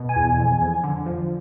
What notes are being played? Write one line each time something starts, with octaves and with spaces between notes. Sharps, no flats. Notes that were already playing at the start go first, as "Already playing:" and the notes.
Already playing: B2
G#5
E2
F2
F2
D3
F3